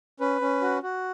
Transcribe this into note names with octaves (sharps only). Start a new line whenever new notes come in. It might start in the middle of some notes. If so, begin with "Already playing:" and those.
C#4 B4
C#4
F#4
F#4